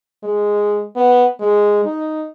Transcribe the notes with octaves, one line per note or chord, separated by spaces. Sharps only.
G#3
B3
G#3
D#4